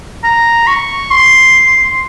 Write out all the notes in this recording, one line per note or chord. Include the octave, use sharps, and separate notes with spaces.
A#5
C#6
C6